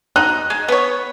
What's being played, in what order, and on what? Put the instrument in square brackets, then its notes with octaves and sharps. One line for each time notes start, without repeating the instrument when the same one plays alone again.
[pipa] D#4 [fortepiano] F#6
[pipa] G#3
B3 C#5